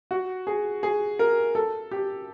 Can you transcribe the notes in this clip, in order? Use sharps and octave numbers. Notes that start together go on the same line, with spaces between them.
F#4
G#4
G#4
A#4
A4
G4